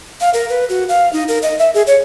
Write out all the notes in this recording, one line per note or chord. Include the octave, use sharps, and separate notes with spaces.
F5
A#4
B4
F#4
F5
D#4
A#4
D#5
E5
G#4
C#5